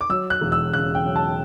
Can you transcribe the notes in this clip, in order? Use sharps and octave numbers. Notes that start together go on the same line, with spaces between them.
D6
F#3 E6
F#6
E1
E6
C#3 F#6
G5
F#3
A5